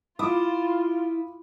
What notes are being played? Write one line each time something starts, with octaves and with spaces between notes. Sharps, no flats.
E4 F4 D6 D#6